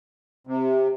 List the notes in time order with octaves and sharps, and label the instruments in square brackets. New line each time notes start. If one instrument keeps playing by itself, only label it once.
[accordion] C3